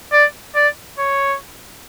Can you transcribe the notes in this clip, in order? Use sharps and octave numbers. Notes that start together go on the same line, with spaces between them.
D5
D5
C#5